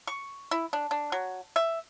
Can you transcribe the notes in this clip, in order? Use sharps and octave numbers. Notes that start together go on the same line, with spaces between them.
C#6
E4
D4
D4
F#3
E5